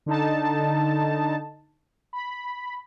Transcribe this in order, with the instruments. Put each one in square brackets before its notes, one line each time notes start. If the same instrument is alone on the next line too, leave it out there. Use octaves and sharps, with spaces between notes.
[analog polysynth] D3 D#4 A5
B5